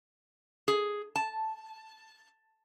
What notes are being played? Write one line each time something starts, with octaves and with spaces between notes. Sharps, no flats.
G#4
A5